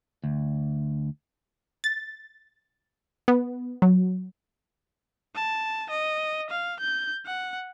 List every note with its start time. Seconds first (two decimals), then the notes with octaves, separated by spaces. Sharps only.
0.24 D2
1.84 A6
3.28 B3
3.82 F#3
5.35 A5
5.90 D#5
6.50 F5
6.80 G6
7.26 F#5